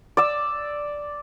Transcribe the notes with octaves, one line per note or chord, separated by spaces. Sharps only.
D5 E6